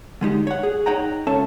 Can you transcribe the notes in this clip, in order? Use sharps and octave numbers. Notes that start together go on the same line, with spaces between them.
D3 G#3 D#4 G4
C#5 F#5
G#4
D#4 C#5 F#5 G5 A#5
C#2 C#4 A4 E5 A5